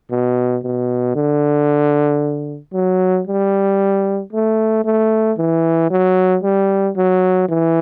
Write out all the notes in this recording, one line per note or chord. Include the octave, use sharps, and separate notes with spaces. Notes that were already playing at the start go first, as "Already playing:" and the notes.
B2
B2
D3
F#3
G3
A3
A3
E3
F#3
G3
F#3
E3